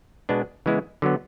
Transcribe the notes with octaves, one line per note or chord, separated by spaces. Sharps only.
B2 G#3 B3 D4
C#3 E3 G#3 B3 E4
D3 F#3 B3